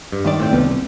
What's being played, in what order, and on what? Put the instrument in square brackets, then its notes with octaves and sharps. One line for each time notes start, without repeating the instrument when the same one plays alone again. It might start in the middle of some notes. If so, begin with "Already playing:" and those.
[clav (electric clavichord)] G2
[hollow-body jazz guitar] C#2 D#3 D5
[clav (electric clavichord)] A2 C4 G5
[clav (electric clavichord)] C2 [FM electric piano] B3
[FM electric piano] B3